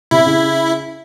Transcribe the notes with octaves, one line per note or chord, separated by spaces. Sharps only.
C3 E4
C#3